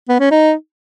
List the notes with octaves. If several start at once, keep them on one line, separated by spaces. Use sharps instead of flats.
B3
C#4
D#4